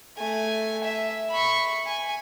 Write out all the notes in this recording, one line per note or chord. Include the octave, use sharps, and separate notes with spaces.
A3 G#5
E5
B5 C#6
G#5